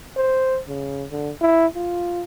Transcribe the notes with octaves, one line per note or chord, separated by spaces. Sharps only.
C5
C#3
D3
E4
F4